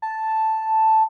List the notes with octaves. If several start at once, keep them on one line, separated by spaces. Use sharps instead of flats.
A5